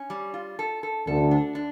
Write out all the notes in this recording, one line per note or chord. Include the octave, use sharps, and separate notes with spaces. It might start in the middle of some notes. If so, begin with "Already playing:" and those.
Already playing: C#4
G3
F4
A4
A4
D2 D3 A4
D4
D4